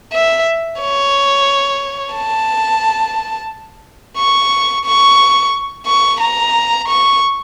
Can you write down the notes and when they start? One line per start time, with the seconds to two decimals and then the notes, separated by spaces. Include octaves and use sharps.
0.12 E5
0.81 C#5
2.15 A5
4.18 C#6
4.85 C#6
5.86 C#6
6.21 A#5
6.88 C#6